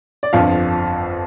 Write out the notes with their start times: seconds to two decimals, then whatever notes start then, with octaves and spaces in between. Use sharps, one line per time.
0.23 D5
0.33 G1 F2 F3 F5